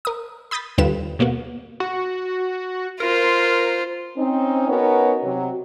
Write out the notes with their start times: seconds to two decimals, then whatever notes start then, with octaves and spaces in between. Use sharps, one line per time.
0.05 A#4 D#6
0.51 B5 D#6 G6 A6 B6
0.78 D#2 D3 G3 F4 B4 E7
1.19 B2 A#3 B3 F#4
1.80 F#4
3.00 F4 A#4 C5
4.17 C4 C#4 D#4
4.69 B3 C#4 D#4 F#4 A#4 C#5
5.23 C3 F#3